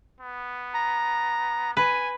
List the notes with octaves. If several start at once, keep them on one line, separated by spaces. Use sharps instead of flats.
B3
A#5
B4 G#5